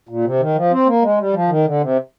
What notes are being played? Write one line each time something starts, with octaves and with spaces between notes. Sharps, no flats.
A#2
C3
D#3
F3
C4
A#3
G#3
G3
F3
D#3
D3
C3